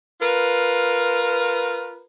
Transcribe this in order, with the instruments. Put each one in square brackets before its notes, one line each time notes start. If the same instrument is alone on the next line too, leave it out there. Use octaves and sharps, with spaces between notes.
[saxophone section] F4 A#4 B4